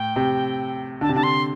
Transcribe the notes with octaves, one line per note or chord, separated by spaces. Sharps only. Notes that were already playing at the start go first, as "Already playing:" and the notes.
Already playing: A2 G5
C3
D3 A5
C3
D3 A5
C6